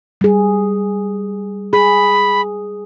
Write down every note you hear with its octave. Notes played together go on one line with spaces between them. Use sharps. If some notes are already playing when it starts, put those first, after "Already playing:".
G3 G#4
G#4 B5